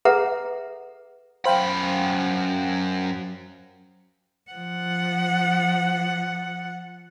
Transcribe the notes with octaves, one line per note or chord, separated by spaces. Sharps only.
G#4 A4 B4 E5 F#5 A#5
F#2 C5 F5 G5 B5
F3 F#5